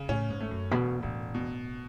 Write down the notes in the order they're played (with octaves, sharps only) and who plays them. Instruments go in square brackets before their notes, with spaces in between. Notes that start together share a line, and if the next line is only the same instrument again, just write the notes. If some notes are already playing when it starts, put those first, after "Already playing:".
Already playing: [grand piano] C#3
[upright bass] A2 [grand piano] C#4
[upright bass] G#2
[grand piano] A3
[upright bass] F#2
[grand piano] E1 [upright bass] B2
[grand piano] E1 [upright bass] A2
[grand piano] B2